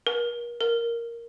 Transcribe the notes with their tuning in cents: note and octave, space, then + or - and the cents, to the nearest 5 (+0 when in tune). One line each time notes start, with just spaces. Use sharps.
A#4 +40
A#4 +0